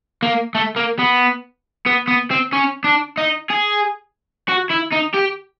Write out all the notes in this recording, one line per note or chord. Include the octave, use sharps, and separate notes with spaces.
A#3
A3
A#3
B3
B3
B3
C4
C#4
D4
D#4
G#4
F#4
E4
D#4
G4